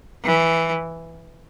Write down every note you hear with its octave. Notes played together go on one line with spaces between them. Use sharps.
E3